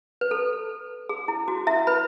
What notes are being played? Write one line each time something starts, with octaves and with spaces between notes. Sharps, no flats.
B4
A4
G#4
E4
F#4
E4 E5
B4 B5